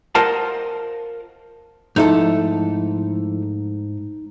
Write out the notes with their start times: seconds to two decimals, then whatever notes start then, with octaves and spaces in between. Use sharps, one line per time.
0.15 F4 A#4 C5 D#5 F#5 A5
1.96 G#2 F3 A3 D#4 E4 A4